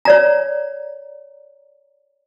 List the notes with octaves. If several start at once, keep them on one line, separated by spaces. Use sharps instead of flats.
C#5 D5 A#5